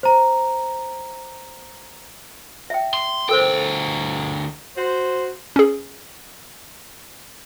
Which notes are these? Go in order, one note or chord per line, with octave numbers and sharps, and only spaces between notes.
C5 A#5
E5 G5
C6
D2 A4 A#4 C5 G5
F#4 C5
C#4 G#4